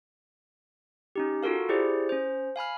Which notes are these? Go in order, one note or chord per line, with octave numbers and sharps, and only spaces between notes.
C#4 D#4 G4
F4 F#4 A4 A#4 F5
E4 G4 G#4 C5 D5
C#4 C5
F5 G#5 B5 F6